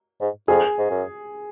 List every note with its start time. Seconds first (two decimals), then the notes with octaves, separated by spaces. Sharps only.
0.21 G#2
0.48 F2 G#4
0.79 G#2
0.90 F#2